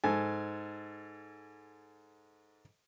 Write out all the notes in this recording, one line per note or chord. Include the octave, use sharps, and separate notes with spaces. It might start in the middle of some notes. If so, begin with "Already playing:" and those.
G#2 A4 G#5